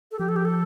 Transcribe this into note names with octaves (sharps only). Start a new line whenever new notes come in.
A4
F3 G4
A4
G4
A4